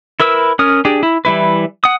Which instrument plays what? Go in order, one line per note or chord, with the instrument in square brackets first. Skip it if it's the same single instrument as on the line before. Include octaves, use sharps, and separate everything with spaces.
[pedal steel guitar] E4 A#4 B4 E6
C#4 A#4 D#6 F6
D4 G4 G#4
E4
E3 G3 E4 B4
F#5 D#6